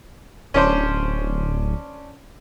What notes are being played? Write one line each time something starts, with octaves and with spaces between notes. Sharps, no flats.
D1 C#4 D4 C5